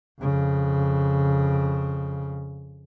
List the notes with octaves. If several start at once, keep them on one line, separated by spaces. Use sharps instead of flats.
F2 C#3